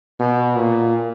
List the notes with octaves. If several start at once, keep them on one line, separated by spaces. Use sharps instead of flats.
B2
A#2